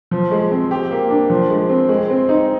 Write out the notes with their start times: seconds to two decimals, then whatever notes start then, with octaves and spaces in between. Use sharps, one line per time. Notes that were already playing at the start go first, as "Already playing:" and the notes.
0.11 F3
0.31 G#3
0.51 C4
0.71 G4
0.91 A#3
1.10 D4
1.30 F3
1.50 G#3
1.69 C4
1.89 G#3
2.10 C4
2.29 D#4